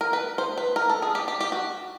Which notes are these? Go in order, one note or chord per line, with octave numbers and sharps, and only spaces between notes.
A#4
B4
C5
B4
A#4
A4
G#4
G4
G4
G4
F#4